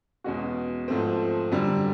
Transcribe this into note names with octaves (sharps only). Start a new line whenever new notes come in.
E2 B2 G#3 C#4 F#4
G#2 F3 A3 C4
F#2 D3 G3